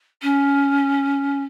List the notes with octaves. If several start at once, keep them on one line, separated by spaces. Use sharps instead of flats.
C#4